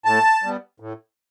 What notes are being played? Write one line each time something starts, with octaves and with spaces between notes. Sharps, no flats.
A2 A5
G3 B3
A2